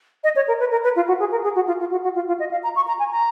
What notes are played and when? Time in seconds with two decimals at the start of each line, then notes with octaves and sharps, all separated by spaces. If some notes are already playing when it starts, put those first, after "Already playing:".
0.24 D#5
0.36 C#5
0.48 A#4
0.60 B4
0.71 A#4
0.84 B4
0.96 F4
1.08 F#4
1.20 G#4
1.31 A#4
1.44 G#4
1.55 F#4
1.67 F4
1.79 F4
1.91 F#4
2.03 F#4
2.15 F4
2.27 F4
2.39 D#5
2.51 F5
2.63 A#5
2.76 C#6
2.87 A#5
2.99 G#5
3.11 A#5